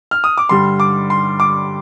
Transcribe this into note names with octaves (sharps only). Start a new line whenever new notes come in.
F6
D#6
D6
G2 D3 G3 C6
D6
C6
D6